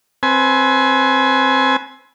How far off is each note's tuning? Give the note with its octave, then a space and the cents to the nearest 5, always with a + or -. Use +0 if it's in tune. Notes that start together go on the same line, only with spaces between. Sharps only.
C4 +10 B4 +0 G#5 +25